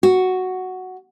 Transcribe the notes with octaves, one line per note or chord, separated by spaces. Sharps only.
F#4